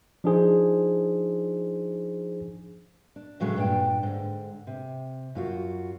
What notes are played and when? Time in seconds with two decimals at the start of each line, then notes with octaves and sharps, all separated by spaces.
0.24 F3 D4 D#4 G#4 C5
3.16 D4
3.40 A2 C#3 F#3 G#3 A3
3.56 G2 A#2 D4 G5
4.03 G#2 D3
4.67 C3
5.35 F#2 F4 F#4